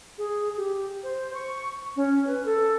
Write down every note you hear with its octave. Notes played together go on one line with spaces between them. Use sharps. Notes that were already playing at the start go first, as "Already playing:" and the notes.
G#4
G4
C5
C#6
C#4
B4
A4